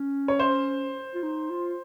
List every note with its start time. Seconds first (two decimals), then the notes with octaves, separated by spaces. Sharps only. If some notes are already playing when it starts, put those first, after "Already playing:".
Already playing: C#4
0.28 C#5
0.39 C5
1.15 F4
1.23 D#4
1.50 F4